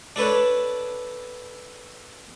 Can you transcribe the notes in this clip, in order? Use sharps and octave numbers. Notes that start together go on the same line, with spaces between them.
D4 A4 B4 C#5